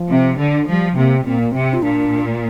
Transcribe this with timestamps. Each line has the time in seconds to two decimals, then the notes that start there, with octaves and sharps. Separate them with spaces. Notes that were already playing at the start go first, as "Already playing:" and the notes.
Already playing: F3
0.10 C3
0.39 D3
0.67 F3 G3
0.96 C3 A#3
1.25 A#2 C4
1.39 A#3
1.52 C3 C4
1.73 F4
1.83 A#2 D4